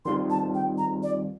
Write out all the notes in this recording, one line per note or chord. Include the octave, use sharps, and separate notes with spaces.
D#3 G3 C4 F4 C6
A5
G5
A#5
D5